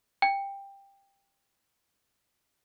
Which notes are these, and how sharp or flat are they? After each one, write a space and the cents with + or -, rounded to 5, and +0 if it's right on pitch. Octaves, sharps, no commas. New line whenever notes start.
G5 +15